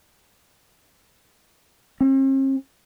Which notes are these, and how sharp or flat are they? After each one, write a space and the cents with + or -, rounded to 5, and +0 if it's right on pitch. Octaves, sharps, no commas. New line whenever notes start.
C4 +45